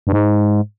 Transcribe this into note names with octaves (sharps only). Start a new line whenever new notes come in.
G2
G#2